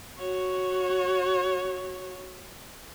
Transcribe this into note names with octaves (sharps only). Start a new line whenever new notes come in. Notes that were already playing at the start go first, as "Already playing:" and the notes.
F#4 C#5